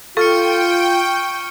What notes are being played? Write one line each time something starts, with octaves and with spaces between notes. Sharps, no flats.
F4 A4 G5 C#6 F6 C#7